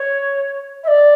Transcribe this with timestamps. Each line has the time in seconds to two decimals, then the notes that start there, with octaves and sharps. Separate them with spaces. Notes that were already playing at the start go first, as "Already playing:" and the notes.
Already playing: C#5
0.83 E5
0.87 D5